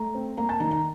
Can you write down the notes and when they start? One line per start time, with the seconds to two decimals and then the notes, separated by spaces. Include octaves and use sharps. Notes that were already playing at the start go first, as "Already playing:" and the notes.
Already playing: A3 A#5
0.15 C4
0.37 A#3 A#5
0.49 A5
0.60 D#3 A#5
0.71 A#5